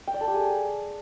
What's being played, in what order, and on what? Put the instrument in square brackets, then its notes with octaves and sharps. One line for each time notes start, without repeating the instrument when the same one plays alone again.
[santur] G5
D5
A4
G4
G#4